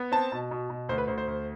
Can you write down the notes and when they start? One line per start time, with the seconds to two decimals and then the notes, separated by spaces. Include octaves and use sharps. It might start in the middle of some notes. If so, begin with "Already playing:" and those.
Already playing: B3
0.12 C4 A5
0.32 B2
0.51 B2
0.70 B2
0.89 D2 C5
0.98 B4
1.08 D2 C5
1.18 C5
1.28 D2